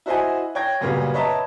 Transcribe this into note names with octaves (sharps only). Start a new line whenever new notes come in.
E4 F#4 C5 D#5 F#5 G#5
C#5 G5 G#6 A#6
F#2 A#2 C#3 G3 B3 F#4
B4 C#5 D#5 E5 A5 A#5